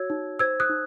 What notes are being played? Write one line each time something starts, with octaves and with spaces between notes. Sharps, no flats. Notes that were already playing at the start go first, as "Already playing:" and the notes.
Already playing: F#4 C#5 E6 G#6
D#4
C5 E6 G#6
D#6 F#6
D#4